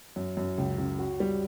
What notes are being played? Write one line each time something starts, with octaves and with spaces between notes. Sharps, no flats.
F#2
F#2
C#2
C#2
F#4
G3